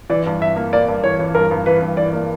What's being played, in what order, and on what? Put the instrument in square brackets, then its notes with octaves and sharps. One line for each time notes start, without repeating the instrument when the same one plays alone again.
[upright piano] E3 [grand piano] D5
[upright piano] G2
[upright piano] G2 [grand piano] E5
[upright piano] A#3
[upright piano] A#3 [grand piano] D5
[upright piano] G2
[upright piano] E3 [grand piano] C#5
[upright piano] E3
[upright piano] G2 [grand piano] A#4
[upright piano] G2
[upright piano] E3 [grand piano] B4
[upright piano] G2
[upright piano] E3 [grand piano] D5
[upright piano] A#3